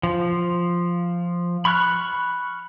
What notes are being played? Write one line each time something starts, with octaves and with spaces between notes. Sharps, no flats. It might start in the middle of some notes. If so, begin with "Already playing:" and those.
F3
B5 C#6 F6 F#6